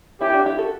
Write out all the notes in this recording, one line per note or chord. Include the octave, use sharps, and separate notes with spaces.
C#4 E4 G4
D4 F#4
E4 G4
F#4 A4